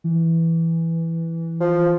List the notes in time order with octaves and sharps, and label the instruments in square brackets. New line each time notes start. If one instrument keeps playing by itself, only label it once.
[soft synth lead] E3
[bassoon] F3